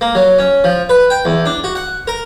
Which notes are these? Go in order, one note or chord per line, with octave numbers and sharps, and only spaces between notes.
A#3
F#3
C#4
F3
B4
G5
E2
D4
F#4
F#5
A#4